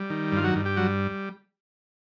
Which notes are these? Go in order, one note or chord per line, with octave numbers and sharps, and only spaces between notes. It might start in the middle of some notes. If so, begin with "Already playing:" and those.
Already playing: G3
D#3
G2 F4
F#3 F#4
G2
G4
F#3 G3 F#4